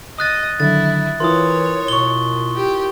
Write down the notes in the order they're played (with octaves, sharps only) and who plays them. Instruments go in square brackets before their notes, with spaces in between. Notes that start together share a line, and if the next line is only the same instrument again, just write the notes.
[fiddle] D#5 [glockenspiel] D#6 F#6 A6
[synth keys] D3 D#3 F#3 [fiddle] E4 [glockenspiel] A6
[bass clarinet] E3 [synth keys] E4 F4 A#4 [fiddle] C#5 [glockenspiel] C6 D#6
[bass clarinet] B2 [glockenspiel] C#6 G7
[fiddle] G4